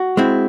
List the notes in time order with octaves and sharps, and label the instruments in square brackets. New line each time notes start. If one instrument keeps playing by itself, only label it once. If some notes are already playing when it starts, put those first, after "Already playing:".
Already playing: [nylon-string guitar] F#4
[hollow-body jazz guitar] G#3 C4 E4